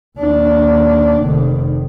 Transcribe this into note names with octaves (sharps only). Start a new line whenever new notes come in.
D#2 D4
F1 D#3